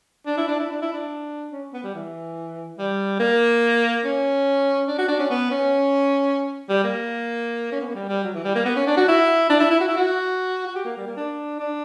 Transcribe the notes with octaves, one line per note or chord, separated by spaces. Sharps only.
D4
E4
D4
E4
D4
E4
D4
C#4
B3
G3
E3
G3
A#3
C#4
D4
F#4
D4
C#4
B3
C#4
G3
A#3
C#4
B3
A#3
G3
G3
F#3
E3
G3
A#3
B3
C#4
D4
F#4
E4
D4
E4
E4
F#4
E4
F#4
F#4
G4
A#3
G3
A#3
D4
D4